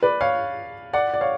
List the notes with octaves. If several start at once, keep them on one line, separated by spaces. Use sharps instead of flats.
B4 D5
C#5 F5
D5 F#5
D5
C#5 F5